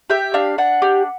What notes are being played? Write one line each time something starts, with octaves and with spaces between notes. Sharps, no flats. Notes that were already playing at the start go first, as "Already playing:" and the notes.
G4 E5
D4 F5
D4 F#5
G4